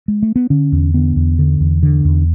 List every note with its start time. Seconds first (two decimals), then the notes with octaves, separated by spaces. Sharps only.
0.08 G#3
0.23 A3
0.36 B3
0.50 D3 C#4
0.72 E2
0.94 D3 B3
1.16 E2
1.39 D3
1.60 E2
1.83 D3
2.05 E2